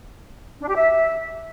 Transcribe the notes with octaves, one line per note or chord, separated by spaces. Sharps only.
D4
G4
E5